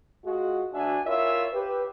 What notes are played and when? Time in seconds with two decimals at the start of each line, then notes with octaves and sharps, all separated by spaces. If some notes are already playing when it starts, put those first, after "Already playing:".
0.24 G#3 F4 F#4
0.73 D2 D4 F#4 E5 G#5
1.06 E4 F4 A#4 C#5 E5
1.53 G4 B4